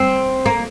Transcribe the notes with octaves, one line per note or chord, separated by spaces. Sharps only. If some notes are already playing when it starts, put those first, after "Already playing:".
Already playing: C4
A#3